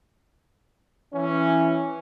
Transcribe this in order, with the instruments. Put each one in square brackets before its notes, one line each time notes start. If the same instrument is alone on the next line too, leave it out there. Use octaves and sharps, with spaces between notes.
[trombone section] E3 C#4